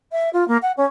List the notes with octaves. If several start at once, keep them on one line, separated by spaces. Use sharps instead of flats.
E5
F4
A#3
F#5
C#4